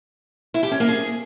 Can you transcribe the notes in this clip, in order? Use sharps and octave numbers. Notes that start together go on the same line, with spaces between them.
E4
G4
C#4
A#3
G#4